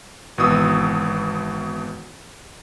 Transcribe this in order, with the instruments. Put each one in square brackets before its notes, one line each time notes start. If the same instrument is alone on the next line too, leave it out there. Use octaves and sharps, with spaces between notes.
[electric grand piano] G#1 B2 E3 D#6 E6